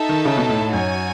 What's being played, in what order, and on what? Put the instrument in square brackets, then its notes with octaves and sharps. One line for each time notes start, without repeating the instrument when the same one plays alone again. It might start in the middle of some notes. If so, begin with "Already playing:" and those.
Already playing: [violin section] D#4 A4 E5 A5
[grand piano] D#3
C#3
B2
A2
A2
[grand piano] F#2 [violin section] F#4 C#5 G#5